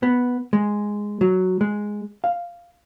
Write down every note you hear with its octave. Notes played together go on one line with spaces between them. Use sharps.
B3
G#3
F#3
G#3
F5